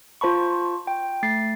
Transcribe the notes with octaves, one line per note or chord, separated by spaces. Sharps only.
F4 C5 A5 B5 C#6
G5
A3 A6 C7